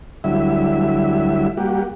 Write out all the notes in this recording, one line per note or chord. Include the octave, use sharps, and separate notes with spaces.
D2 F#3 G3 E4 E5
G3 A#3 F#4 G4